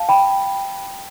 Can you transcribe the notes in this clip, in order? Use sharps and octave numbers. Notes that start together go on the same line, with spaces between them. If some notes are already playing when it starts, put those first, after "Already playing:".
Already playing: F5 A5
G5 B5